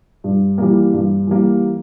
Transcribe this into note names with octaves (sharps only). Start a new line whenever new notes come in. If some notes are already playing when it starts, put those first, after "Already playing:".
G2
E3 G3 A#3
G2
E3 G3 A#3